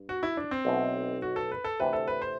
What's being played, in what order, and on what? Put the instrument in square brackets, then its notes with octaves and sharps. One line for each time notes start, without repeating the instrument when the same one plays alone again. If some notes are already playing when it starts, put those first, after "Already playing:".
Already playing: [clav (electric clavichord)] G2
[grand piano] F#4
E4
D4
C4
[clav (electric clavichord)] B1 B2 A3 E4
[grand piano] F#4
A4
B4
A4
[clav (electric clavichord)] D2 C3 E3 A3 C4 [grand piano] B4
[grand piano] A4
B4
C5